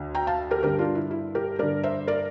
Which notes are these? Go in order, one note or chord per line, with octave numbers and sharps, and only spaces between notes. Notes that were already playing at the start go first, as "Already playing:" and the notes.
Already playing: D2 D3
G5 A#5
F5 A5
G4 A#4
G2 D3 G4 A#4
D4 F4
E4
E4
G4 A#4
G2 D3 A#4 D5
C5 E5
A#4 D5